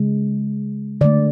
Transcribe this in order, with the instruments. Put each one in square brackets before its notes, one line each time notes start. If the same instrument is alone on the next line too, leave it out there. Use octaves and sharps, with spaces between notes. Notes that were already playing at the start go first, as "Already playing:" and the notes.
Already playing: [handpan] C#3 G#3
D3 A3 D5